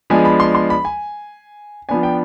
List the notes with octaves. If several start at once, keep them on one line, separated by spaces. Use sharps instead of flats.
F3 G#3 B3 D4 G#5
B5
C6
C6
B5
G#5
F3 B3 D4 G#5
G5